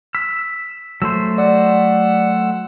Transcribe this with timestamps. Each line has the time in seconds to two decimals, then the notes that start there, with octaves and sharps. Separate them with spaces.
0.15 E6 B6
1.02 F#3 A3 C5 E6
1.38 D5 F#5 E6